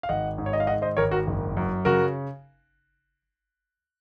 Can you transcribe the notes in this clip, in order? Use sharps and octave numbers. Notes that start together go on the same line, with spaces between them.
F5
G#1 D#5 F#5
G#2
C#5
D#5
F5
D#3 D#5 F#5
C5 D#5
G#1 A#4 C#5
F#4 A#4
F#1
F#2
C#3 F#4 A#4